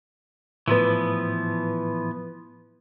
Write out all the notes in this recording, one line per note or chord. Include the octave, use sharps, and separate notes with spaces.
A2 E3 F3 B3 B4